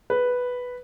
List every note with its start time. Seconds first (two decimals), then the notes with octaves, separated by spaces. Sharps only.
0.10 B4